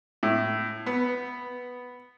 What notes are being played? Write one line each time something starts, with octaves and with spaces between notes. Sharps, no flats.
A2
B3